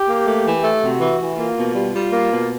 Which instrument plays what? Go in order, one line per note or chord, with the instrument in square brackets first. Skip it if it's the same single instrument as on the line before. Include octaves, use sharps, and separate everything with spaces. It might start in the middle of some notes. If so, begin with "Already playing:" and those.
Already playing: [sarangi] G4
[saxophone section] A#3
A3
E3
A3
[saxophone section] C3 [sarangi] F#4
[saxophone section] E3
E3
[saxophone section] A#3 [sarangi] F4
[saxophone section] B2
G3
[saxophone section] G3 [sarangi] F4
[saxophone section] A#3
B2